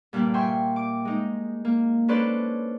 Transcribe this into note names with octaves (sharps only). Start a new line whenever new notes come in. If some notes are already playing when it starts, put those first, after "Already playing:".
G2 A#2 G3 A#3
E5 G5 G#5 C6 C#6
D6
G#3 D#4
A#3
C#4 D4 A4 B4 C5 D5